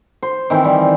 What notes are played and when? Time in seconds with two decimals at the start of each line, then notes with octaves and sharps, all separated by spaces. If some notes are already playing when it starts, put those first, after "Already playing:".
0.23 C5
0.50 D#3 E3 C4
0.65 G3